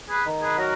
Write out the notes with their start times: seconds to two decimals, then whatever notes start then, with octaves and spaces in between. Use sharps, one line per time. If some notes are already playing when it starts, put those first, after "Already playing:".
0.09 G#4 B4
0.25 D#3
0.41 G#4 B4
0.57 F#3 F#4 A#4